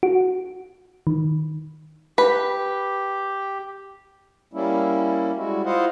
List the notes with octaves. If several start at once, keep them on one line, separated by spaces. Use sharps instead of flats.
F#4
D#3
G4 B4
G3 A#3 C#4 E4
G3 G#3 E4 F#4
E4 F4 C5 D#5 F5 F#5